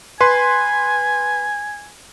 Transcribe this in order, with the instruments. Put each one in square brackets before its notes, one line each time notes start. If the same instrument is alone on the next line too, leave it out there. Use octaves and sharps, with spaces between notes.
[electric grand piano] B4 C6 [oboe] G#5